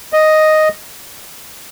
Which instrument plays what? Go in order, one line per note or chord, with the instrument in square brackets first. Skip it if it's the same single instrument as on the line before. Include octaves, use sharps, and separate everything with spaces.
[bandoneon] D#5